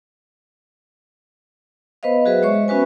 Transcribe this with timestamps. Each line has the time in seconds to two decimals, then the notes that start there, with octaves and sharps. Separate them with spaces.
2.03 B3 B4 C5 D#5 F5
2.25 F#3 F#4 G#4 B4 E5
2.42 G#3 C5 C#5 D#5 E5 C#6
2.68 B3 C#4 F#4 B4 G#5